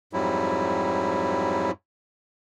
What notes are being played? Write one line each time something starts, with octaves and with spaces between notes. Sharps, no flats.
F2 G#2 F#3 G3 E4